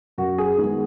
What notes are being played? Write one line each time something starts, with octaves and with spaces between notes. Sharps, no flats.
F#2 F#4
G#4
D#3 G#3 B3